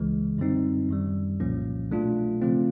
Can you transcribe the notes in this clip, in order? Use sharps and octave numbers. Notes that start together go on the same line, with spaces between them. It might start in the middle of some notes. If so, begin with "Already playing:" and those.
Already playing: C#2 C#3 E3 G#3
F#2 D3 G3 C4 D#4
F#2 D#3 G3
C2 A#2 F3 A#3 C#4
B2 F#3 A3 D4 F4
C#3 F3 A3 C4 F4